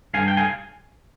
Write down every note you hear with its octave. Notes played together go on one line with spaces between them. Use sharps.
G2 F5 G#5
G5
F5 G#5